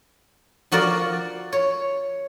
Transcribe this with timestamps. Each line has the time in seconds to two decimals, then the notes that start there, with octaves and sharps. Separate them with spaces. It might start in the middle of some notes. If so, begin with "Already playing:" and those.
0.72 F3 F#4 A#4 D5
1.52 C#5